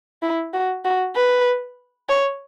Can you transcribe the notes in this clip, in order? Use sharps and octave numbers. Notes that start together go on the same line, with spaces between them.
E4
F#4
F#4
B4
C#5